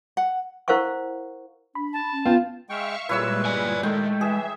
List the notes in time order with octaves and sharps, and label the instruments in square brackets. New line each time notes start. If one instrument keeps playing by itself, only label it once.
[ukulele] F#5
[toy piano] E4 A#4 C5 F5 F#5 C#6
[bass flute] D4 [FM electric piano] B5
[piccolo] A5
[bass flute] C#4
[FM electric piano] B3 G5 [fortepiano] F4
[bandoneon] G#3 G5 [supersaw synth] E5 F5 C#6
[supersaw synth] A#2 G3 G#3 [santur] E4 C#5 E6 [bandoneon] B4
[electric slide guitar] D5 G#5
[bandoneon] D#3 [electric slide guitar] G#3 [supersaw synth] A3 [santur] G5
[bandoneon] E3 [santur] G#4 [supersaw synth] E5